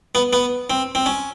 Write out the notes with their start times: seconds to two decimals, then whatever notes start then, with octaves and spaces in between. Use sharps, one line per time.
0.15 B3
0.33 B3
0.70 C4
0.95 C4
1.06 C#4